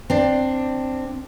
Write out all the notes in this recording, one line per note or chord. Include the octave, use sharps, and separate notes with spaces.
C4 D4